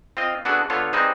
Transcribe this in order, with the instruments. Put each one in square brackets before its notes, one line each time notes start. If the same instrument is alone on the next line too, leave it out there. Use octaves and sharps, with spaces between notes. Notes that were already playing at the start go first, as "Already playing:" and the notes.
[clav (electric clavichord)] C4 F4 D#5
B3 D4 F#4 G#4 A4
D3 B3 F4 A4 C#5
G3 C4 D#4 G#4 B4 C5